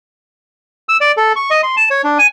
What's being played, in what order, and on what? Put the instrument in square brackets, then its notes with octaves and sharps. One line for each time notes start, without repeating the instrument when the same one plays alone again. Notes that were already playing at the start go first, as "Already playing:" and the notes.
[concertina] E6
D5
A4
C#6
D#5
C6
A5
C#5
D4
G#5